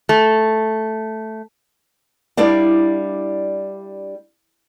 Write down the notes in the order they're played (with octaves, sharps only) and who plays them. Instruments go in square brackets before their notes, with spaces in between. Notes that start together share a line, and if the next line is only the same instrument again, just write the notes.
[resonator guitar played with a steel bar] A3
[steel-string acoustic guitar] G3 D4 E4 D5 F5